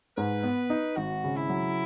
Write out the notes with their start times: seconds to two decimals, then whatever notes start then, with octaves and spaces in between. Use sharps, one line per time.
0.17 G#2 B4
0.43 B3
0.70 D#4
0.97 G#1 F#4
1.24 C#3
1.36 E4
1.49 F#3